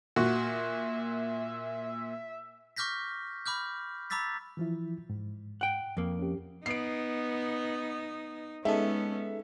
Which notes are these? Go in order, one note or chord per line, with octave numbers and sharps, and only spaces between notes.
A#2 F#4 E5
C#6 D6 F6 G6 A#6 B6
B5 D6 F6 G6
A#5 B5 D6 E6 A6 B6
E3 F3 E4
G#2
F#5 G5
F2 A#3
C#4 G4
B3 D#4 C7 D7
G#3 B3 C#4 D#4 A4 E5